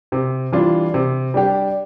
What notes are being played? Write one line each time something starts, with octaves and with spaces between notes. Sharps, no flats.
C3
E3 G3 D4 F4
C3
G3 D4 G4